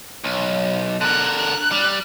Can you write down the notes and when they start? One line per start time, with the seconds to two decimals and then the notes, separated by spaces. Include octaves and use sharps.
0.24 B1
1.01 D3 A#4 F#6
1.38 F#6
1.72 G3